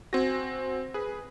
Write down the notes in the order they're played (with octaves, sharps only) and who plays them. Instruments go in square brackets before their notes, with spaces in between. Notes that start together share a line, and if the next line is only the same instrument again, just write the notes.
[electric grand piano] C4 A#6 [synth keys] F#4 G#5
[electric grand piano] G#4 [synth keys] B4